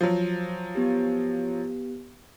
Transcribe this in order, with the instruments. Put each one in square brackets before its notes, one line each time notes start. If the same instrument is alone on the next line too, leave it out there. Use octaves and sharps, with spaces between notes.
[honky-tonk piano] F3 F#3
[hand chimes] B3 G4